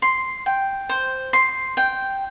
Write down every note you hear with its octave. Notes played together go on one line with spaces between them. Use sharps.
C6
G5
C5
C6
G5